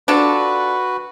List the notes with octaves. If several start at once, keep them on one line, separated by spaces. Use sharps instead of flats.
D4 F4 F#4 A4 B4